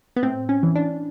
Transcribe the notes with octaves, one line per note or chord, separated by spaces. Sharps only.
B3
A2 C4
C#4
E3
D4